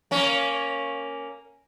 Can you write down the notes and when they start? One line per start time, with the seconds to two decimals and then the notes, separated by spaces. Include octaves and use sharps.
0.11 A#3 C#4